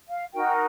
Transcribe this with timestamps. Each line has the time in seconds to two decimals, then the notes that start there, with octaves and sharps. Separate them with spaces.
0.09 F5
0.34 D#4 F#4 A#4 G5